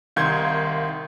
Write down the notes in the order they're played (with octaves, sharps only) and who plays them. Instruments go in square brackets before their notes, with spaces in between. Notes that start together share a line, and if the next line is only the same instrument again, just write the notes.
[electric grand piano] C2 D#3 C6 [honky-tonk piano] F5 G6 G#6